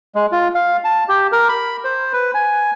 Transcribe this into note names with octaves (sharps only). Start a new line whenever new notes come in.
G#3
F4
F5
A5
G4
A#4
B5
C5
B4
G#5